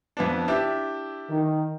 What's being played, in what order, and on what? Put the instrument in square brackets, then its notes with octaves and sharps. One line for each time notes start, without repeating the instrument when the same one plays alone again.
[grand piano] F2 B3 D4
D4 E4 G4
[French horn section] D#3